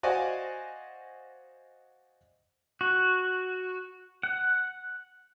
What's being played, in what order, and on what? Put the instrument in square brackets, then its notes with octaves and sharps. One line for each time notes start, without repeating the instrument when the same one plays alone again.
[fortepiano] F#4 C5 D5 D#5 F5 G#5
[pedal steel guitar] F#4
F#5